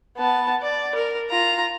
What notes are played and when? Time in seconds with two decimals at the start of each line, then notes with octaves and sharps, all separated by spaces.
0.17 B3 A5
0.62 D5
0.95 A#4
1.30 F4 A#5